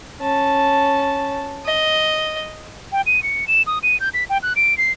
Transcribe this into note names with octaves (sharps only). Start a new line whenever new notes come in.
C#4 A5
D#5
G5
D#7
C#7
E7
D#6
D#7
G6
B6
G5
F#6
D7
C7